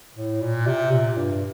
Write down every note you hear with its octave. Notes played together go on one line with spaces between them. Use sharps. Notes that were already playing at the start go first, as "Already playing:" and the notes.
A2
A#2
C3
A#2
G2